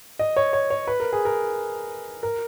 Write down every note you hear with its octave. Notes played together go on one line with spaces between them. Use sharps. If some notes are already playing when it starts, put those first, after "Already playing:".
D#5
C#5
C#5
C#5
B4
A#4
G#4
A#4
A#4